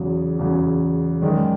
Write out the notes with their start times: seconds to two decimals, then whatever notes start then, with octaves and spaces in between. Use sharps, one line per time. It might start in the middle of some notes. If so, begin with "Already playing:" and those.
Already playing: E2 C#3 F#3
0.39 E2 C#3 F#3
1.22 F#2 D#3 G#3 D5